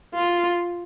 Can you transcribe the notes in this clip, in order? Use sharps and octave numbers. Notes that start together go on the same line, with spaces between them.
F4